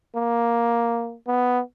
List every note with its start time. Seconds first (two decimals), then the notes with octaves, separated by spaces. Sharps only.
0.15 A#3
1.27 B3